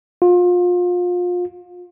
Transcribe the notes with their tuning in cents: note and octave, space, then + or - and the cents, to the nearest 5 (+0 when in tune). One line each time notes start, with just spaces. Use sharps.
F4 +30